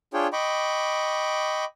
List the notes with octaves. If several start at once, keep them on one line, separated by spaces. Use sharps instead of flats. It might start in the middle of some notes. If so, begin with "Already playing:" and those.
D4 F4 G#4 C#5 G5
D#5 G5 B5 C#6 D6